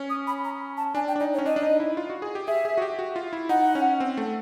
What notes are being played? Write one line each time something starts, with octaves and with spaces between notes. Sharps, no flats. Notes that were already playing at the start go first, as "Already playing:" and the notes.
Already playing: C#4
D#6
B5
A#5
A5
D4 G#5
G5
D4
D#4 D5
C#5
C#4
D4 D#5
D4
D#4
E4
F4
F#4
G#4
G4
G#4 E5
G#4
F#4
G4
F#4
F4
E4
D#4 F#5
C#4
C4
A3